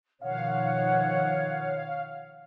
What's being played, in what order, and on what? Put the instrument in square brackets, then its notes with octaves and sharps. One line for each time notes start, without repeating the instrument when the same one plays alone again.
[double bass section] B2 D#3 F3 [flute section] C#5 F#5 [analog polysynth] F5